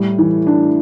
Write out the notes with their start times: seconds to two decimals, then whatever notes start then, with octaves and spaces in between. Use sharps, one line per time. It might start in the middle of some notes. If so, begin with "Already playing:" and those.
Already playing: A2 G3
0.19 E3
0.47 D4